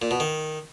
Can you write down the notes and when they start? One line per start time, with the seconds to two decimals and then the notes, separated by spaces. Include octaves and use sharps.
0.02 A#2
0.11 B2
0.20 D#3